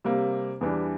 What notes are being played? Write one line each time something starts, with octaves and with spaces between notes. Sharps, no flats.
C3 G3 A#3
E2 E3 G3 D4